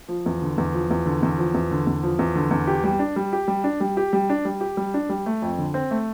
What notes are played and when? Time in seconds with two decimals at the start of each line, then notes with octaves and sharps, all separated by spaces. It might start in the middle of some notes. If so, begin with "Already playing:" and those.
0.09 F3
0.26 E2
0.42 D3
0.58 E2
0.73 F3
0.90 E2
1.06 D3
1.23 E2
1.38 F3
1.54 E2
1.71 D3
1.87 E2
2.03 F3
2.19 E2
2.35 D3
2.51 E2
2.67 G4
2.84 G3
2.99 D4
3.16 G3
3.33 G4
3.48 G3
3.64 D4
3.80 G3
3.97 G4
4.13 G3
4.30 D4
4.45 G3
4.61 G4
4.77 G3
4.94 D4
5.09 G3
5.26 A3
5.42 F2
5.58 D3
5.74 C4
5.91 A3